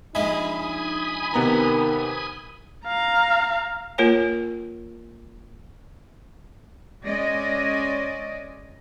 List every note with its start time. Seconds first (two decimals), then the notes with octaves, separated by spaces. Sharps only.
0.15 A#1 G#3 D#4 E5 G#5 B5 D#6
1.34 C3 D#3 B3 A#5
2.86 F5 A#5
3.98 A#3 F4 A#4 C#5 G#5
7.05 G#3 C#4 D5 D#5